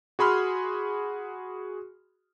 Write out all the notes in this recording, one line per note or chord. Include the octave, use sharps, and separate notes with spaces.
F#4 G#4 B5 C6 F6